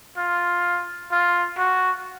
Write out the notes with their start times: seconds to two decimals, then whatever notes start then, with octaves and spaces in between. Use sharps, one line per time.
0.17 F4
1.11 F4
1.58 F#4